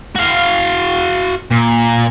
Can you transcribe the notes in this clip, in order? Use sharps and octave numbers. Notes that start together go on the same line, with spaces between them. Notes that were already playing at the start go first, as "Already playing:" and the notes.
F#4 F5
A#2